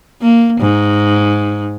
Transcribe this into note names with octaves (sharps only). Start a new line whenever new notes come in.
A#3
G#2